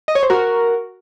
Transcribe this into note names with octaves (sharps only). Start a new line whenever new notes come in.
D#5
C#5
C5
F#4 A#4